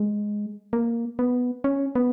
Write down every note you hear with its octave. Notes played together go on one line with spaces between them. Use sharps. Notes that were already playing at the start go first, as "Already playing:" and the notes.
Already playing: G#3
A#3
B3
C#4
B3